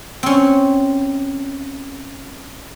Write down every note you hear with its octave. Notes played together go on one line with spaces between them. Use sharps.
C4 C#4